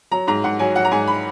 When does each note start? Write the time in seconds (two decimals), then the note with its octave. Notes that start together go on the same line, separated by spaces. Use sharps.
0.11 F#3 A#5
0.27 G#2 A#5
0.44 G#2 F#5
0.59 F#3 G#5
0.76 F#3 F#5
0.85 A#5
0.92 G#2 G#5
1.07 B5